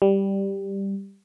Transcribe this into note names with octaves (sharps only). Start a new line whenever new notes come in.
G3